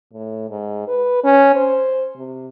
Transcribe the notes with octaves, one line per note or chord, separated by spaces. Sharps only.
A2
G#2
B4
C#4
C5
C3